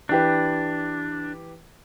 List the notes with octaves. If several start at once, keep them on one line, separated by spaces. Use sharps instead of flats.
E3 D4 G4 B4